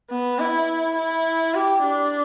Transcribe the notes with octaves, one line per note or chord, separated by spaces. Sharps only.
B3
E4
E4
G4
D4